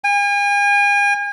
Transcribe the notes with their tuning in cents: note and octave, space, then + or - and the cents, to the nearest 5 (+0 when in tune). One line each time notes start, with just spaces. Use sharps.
G#5 -40